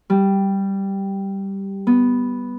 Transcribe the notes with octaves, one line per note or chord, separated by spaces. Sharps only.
G3
B3